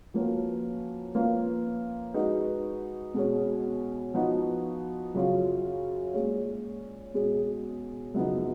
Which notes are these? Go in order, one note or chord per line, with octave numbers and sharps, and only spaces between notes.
F3 A#3 C#4 F#4 B4
F3 A#3 C#4 F4 B4
G#3 D#4 F#4 B4
B2 G#3 C#4
F3 B3 D#4 F#4
F#2 C#3 F#3 C#4 F4
A#2 G#3 C#4
B2 G#3 C#4 G#4
F#2 C#3 F3 B3 D#4